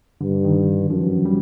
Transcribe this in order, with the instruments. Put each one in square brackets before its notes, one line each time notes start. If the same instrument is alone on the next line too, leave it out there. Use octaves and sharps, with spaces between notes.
[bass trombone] G2 [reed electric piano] D3
[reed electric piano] D#3
[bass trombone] F#2 [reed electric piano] F3
[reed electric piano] G3